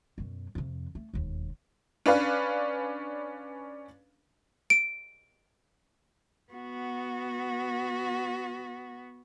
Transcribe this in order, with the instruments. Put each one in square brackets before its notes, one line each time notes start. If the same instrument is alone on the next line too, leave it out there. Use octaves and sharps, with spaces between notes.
[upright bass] F#2 B2
F2 C3
A3
E1 D#2
[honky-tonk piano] C#4 D4 B4 F5
[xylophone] D7
[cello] B3 F#4